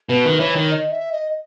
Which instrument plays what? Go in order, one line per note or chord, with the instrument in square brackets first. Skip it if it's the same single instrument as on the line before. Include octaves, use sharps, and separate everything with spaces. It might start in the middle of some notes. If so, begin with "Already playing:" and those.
[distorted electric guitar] B2 [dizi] B4
[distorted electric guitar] D#3
[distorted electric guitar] E3 [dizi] C#5
[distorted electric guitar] D#3
[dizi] D#5
E5
D#5